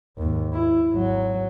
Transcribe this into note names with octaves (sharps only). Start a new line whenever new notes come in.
D#2 G#2
E4
G#1 F#3